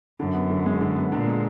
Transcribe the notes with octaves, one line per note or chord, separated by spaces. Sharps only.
F#2 D3
B3
D3
G#3
D3
B3
A#2 D3
G#3